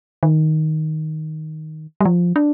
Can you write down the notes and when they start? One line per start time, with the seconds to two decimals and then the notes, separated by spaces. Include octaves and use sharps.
0.23 D#3
2.01 G3
2.05 F3
2.36 D4